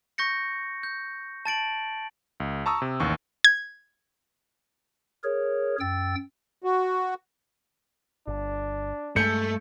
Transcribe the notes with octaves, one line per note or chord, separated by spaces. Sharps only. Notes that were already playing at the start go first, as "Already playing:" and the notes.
C#6 G6 A#6 C#7
G6
A5 A6 D7 F#7
C#2
A5 A#5 C#6 D#6 E6
C3
A1 D#2 C#6
G#6
G#4 A#4 C#5
F#2 G5 E6 A6
F#4
G1 D4
G2 G#3 A3 G6 C#7